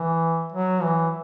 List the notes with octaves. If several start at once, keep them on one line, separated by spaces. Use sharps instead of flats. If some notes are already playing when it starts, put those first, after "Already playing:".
Already playing: E3
F#3
E3